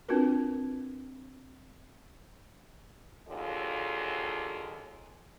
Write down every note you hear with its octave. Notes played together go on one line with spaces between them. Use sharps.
C4 D4 F4 F#4 A#4 B4
D#2 D3 F#3 F4 G#4 D#5